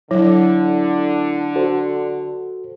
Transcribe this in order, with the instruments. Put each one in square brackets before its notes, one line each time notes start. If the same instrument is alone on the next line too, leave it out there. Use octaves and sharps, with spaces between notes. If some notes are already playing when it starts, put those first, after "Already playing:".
[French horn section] D3 [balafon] F#3 [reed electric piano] E4
[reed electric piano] F#4 A4 C5